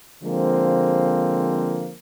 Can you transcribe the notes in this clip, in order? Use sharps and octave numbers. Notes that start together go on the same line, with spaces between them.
D3 F3 G#3 A#3 C4